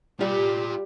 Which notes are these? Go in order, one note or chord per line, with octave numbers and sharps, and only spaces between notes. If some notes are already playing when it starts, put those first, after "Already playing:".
G3 F4 G4 D5